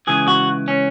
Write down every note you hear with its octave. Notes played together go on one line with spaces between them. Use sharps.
C#2 C#3 E3 G#4
F#4
C#4